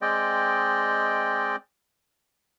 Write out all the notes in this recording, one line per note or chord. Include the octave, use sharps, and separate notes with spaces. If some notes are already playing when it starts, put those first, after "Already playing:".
G#3 C4 D5 D#5 G5